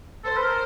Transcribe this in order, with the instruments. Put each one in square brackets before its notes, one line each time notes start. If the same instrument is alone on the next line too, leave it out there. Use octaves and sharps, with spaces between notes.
[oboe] A4 [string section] C5
[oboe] B4
A#4